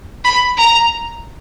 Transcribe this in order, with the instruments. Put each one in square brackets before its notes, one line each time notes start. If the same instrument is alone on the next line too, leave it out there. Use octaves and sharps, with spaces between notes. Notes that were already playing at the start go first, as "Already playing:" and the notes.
[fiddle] B5
A#5